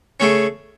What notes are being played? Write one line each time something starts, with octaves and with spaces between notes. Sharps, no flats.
C#3 A3 C#4